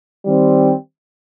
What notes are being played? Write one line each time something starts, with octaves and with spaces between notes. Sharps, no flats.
D#3 G3 C4